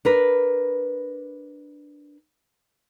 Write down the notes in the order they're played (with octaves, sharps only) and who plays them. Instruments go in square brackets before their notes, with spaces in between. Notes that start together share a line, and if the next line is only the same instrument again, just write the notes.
[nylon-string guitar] D4 A#4 B4